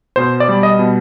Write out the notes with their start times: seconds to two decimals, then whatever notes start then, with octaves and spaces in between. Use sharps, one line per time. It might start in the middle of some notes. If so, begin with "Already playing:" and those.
0.16 B2 C5
0.40 D5
0.49 G3
0.63 D#5
0.79 B2